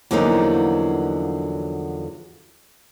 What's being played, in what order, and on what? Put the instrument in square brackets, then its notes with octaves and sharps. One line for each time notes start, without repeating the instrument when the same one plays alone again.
[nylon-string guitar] E2 D3 F3 F#3 A#3 D#4